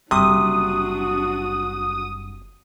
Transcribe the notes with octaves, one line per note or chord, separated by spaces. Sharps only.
F#1 C3 G3 D4 F#4 D#6